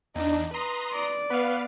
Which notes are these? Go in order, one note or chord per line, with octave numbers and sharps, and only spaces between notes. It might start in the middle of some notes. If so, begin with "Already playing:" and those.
E2 D4 D#4
B4 A#5 C6 D#6
D5
B3 B4 F5